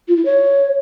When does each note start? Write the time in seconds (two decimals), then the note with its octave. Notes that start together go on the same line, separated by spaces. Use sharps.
0.08 F4
0.17 E4
0.25 C#5